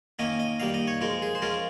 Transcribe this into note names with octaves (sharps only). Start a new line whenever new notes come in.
D#3 A#3 C#4 D#5
D#5
D#3 G3 A#3 D#4 F5
D#5
C#5
F3 G#3 D#4 A#4
G#4
C5
F3 G#3 C#4 F4 A#4